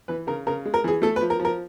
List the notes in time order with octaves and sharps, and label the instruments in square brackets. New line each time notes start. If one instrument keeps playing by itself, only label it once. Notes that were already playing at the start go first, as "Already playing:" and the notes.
[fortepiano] E3 B4
C#3 A#4
C#3 A#4
G#3
A#4
E3 G#4
A3 A4
B4
F3
A#4
F3
A#4